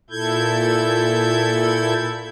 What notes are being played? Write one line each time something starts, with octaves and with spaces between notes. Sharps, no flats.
A#2 E4 A4 G6 G#6